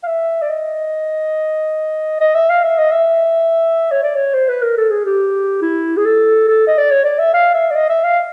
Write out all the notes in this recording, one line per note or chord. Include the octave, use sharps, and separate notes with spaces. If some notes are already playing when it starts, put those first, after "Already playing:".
F5
E5
D5
D#5
D#5
E5
F5
E5
D#5
E5
C#5
D5
C#5
C5
B4
A#4
A4
G#4
G4
E4
G#4
A4
A4
D#5
D5
C#5
D5
E5
F5
E5
D5
D#5
E5
F5